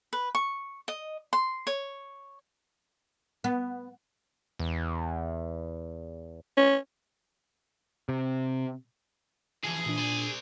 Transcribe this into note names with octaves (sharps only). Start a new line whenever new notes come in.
B4
C#6
D#5
C6
C#5
B3
E2
C#4
C3
E3 F3 G#4
A#2 D4
C5 D5